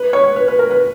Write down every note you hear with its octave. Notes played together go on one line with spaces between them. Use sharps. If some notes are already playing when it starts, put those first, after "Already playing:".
Already playing: B4
C#5
B4
B4
A#4
B4